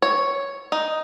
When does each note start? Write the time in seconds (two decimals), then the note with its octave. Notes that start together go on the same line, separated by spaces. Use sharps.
0.02 C#5
0.72 D#4